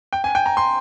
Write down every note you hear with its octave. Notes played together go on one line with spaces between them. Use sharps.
G5
G#5
G5
A#5
C6